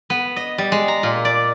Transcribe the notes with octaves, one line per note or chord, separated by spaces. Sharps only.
B3
D#5
G3
G#3
A#5
A#2
D5